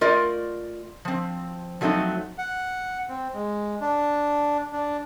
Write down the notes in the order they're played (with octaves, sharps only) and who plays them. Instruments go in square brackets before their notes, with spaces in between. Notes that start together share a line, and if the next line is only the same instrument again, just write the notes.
[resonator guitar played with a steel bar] A3 F4 A#4 D5 D#5
F3 C4
F3 F#3 A3 C4 D#4
[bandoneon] F#5
C4
G#3
D4
D4